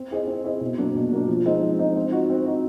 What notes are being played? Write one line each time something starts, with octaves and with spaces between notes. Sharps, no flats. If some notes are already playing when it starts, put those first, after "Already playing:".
Already playing: C4
E4 G#4 C5 D#5
C4
E4 G#4 C5 D#5
B2
F#3 A#3 D4
B2
F#3 A#3 D4
F3
G#3 C4 D#4
F3
G#3 C4 D#4
C4
D#4 F#4
C4
D#4 F#4